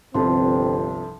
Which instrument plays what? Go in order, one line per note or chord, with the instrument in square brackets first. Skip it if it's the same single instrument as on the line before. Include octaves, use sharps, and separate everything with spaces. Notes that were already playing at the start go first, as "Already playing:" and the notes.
[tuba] G1 [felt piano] C2 C3 F3 [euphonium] C4 [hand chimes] A4 A5 C6